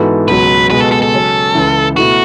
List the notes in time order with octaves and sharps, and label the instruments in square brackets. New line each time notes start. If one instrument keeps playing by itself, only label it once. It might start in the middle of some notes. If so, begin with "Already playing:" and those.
Already playing: [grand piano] G#2 E3 B3 F#4 A4
[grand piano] C#2 B2 F#3 [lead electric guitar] B4
[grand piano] C#2 B2 G#3 B3 F#4 [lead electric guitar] B4
[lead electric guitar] A4
A4
A4
[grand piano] C#3 F#3 C#4
C#2 C#3 E3
[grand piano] B2 A3 E4 A4 [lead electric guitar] F#4